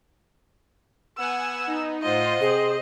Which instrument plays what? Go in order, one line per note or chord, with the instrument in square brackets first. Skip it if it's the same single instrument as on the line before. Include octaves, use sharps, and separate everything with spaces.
[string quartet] B3 [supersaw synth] F#5 G#5 [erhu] E6
[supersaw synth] D#4
[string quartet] A2 F4 F#5 [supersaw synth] C5 [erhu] D#5
[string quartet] C3 C4 [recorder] G#4